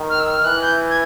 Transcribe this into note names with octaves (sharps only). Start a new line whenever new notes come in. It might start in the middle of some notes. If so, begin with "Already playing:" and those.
Already playing: D#3
F6
E6
F6
E3 F#6
G6
G#6